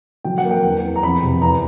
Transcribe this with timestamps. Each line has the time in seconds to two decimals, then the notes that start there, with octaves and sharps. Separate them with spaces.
0.24 F#3 G5
0.38 F#5
0.45 A#3
0.51 G5
0.64 E2
0.83 E2
0.96 A#5
1.03 F2 B5
1.22 C3
1.42 E2 A#5